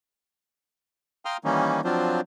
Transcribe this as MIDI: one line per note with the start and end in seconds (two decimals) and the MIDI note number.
1.25 1.37 77
1.25 1.37 79
1.25 1.37 82
1.25 1.37 84
1.25 1.37 87
1.25 1.37 89
1.45 1.81 51
1.45 1.81 52
1.45 1.81 55
1.45 1.81 58
1.45 1.81 61
1.45 1.81 63
1.85 2.21 53
1.85 2.21 54
1.85 2.21 60
1.85 2.21 62
1.85 2.21 65
1.85 2.21 72